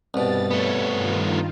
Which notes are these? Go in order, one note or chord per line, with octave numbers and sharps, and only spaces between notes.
C2 G2 B2 A6
A3 B3 C#5
G2 D#3 F4